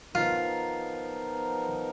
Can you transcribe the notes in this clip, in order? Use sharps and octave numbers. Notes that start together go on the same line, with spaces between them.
F3 B3 D#4 F4 A#4